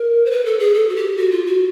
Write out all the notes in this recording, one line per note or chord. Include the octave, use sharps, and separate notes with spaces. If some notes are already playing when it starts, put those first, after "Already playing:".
Already playing: A#4
C5
B4
A4
G#4
A4
F#4
G4
F#4
F4
F#4